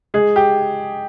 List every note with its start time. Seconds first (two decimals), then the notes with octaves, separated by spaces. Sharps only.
0.14 G#3 G#4
0.36 G4